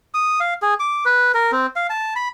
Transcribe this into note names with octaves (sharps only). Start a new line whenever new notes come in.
D#6
F5
G#4
D6
B4
A#4
C4
F5
A5
B5